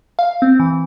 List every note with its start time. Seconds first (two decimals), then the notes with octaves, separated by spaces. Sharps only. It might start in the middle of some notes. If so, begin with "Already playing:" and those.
0.19 F5
0.42 C4
0.60 E3